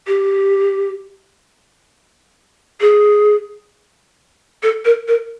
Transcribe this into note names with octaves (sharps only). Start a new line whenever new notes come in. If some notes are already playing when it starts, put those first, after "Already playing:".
G4
G#4
A4
A#4
A#4